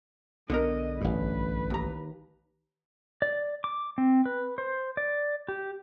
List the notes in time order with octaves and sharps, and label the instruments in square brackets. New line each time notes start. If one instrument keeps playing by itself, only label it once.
[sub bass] B1 [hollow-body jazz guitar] D3 B3 A#4 [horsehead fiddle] D#5
[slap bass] A1 G2 [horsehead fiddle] B4
[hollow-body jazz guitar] D#2 A#5
[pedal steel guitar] D5
D6
C4
B4
C5
D5
G4